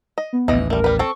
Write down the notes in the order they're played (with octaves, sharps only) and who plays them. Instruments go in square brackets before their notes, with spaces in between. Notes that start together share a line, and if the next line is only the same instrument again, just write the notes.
[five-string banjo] D#5
[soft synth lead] B3
[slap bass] A1 D#2 [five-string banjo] E3 D#5
[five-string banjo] G3 A3 [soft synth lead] A#4
[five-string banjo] G3 B4
[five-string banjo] C4 A4 [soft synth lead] C#6